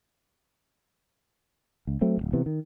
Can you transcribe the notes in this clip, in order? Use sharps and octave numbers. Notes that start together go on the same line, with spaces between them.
C#2
F#3 A3 C4
D1 A#1
C3 E3 B3
D#3